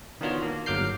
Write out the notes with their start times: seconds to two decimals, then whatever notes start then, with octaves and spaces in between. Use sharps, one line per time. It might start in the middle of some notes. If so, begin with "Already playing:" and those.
0.21 D#3 B3 D4 F4 F#4 C#5
0.42 A#3
0.66 G1 F#3 D6 F6 G6 C7